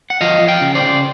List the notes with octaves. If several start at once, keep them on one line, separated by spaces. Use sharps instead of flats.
F#5
F3 D#5 F5
F3
F5 G5
C#3
C5 D5
C#3